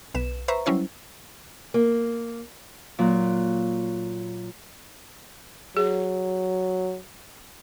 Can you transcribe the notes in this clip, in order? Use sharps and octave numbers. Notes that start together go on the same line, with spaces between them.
B1 B4 E7
B4 C5 E5 A#5 C#6
F#3 G3 C#4 E4 C5
A#3
A#2 F#3
F#3 G#4